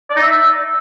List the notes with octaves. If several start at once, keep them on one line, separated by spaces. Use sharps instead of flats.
D5
D#4
E5